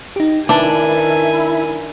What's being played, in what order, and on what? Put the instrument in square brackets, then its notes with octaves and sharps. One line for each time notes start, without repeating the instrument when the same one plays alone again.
[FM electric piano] D#4 G4
[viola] D#3 G#5 [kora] D4 [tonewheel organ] E4 [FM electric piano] B4 E5 A5